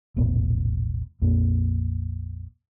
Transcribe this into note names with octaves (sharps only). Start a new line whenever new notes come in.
E1 A#1 A2 B3
A#1 F2 A#3